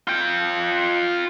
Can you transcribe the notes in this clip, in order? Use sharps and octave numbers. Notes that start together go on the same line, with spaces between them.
F4 G5